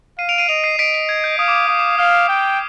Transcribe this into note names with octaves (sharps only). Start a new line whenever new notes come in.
F5 C7 D#7
D7 F7
C7 D#7
D#5 D7 F7
C7 D#7
D#5 B6 D7
B6
G#6
G6
F5 D#6
D6
D#6
F5 D#6
D6
D#6
F5 F6
G5